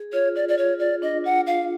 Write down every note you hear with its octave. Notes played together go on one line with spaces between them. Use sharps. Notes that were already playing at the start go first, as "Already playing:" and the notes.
Already playing: G#4
F4 C#5
F4 D5
D5
F4 C#5
F4 D5
D4 D#5
F4 F#5
F4 F5